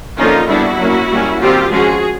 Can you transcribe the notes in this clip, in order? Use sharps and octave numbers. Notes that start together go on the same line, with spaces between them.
D3 F3 A#3 C#4 D#4 F4
G3 B3 D4 E4 F#4
F#3 A#3 C#4
G3 A#3 C#4
D#3 G3 C4 F4 G4
F3 G#3 C#4 F#4 G#4